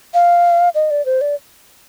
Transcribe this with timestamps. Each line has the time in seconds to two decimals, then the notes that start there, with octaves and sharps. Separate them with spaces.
0.14 F5
0.75 D#5
0.91 D5
1.06 C5
1.21 D5